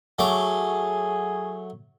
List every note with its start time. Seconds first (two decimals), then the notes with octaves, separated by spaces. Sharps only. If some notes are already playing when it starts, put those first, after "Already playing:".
0.19 F#3 A3 G#4 D6